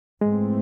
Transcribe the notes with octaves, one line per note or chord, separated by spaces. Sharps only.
G#2 E3 G#3 A3 C4